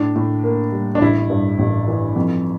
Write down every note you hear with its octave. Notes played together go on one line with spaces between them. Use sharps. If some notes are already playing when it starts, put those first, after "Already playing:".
Already playing: A2 D4
A2
A#3
G3
D4
A1 E4
G2
A1
E3
F2